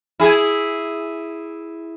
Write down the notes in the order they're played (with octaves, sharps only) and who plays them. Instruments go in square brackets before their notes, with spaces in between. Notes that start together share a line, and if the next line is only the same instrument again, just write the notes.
[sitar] E4 G#4